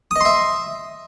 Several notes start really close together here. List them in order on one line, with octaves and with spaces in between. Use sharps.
D#6 D#5 C6 E5